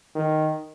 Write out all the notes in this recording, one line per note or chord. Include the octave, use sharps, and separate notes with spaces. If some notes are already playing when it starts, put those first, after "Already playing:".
D#3